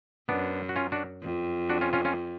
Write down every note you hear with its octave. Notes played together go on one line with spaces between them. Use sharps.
F#2 B3 D4
F#4
C#4 F4
D4 F#4
F2
D4 F#4
C#4 F4
C#4 F4
C#4 F4